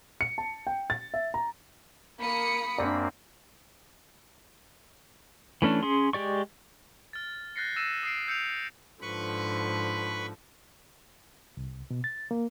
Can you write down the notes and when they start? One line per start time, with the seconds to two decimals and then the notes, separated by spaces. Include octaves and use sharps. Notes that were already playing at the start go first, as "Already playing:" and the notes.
0.21 C#7
0.38 A5
0.67 G5
0.90 A6
1.14 E5
1.34 A#5
2.20 A#3 B5 D#6 C#7
2.78 F#2 A#3 C4 D4 D5
5.62 E3 A3 C#4 D4
5.83 C#4 G#4 C6
6.13 G#3 G4 D5 C#6
7.13 F6 A6
7.56 F#6 G6 A6 A#6 C7 C#7
7.76 E6 F#6 A#6 C#7 D#7 E7
8.03 D#6 C7 D7
8.27 E6 G6 C#7 D7 F7
9.02 G#2 D3 F3 B4 B5 C#6
11.57 C2
11.91 B2
12.04 A6
12.31 A#3